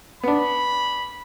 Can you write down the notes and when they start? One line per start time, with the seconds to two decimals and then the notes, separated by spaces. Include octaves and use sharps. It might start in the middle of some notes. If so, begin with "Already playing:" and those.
0.24 B3 D4 B5